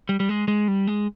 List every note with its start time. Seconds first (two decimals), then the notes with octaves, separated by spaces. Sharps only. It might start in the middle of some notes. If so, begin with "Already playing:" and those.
0.09 G3
0.20 G3
0.29 G#3
0.48 G#3
0.68 G3
0.87 G#3